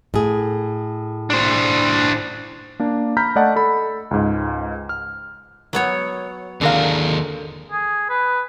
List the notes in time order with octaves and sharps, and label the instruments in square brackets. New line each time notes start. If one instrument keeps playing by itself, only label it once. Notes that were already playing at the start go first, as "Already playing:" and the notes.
[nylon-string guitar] A2 G#4
[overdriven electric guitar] D4 C5
[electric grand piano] A#3 D4
A#5 B5 F6 G6 B6
A3 D5 D#5 F#5 A5
A4 B5
C#2 G#2
F6
[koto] F#3 B3 C#5
[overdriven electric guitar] D#2 G#4 [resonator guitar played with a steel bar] D3 A#4 F5
[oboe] G#4
B4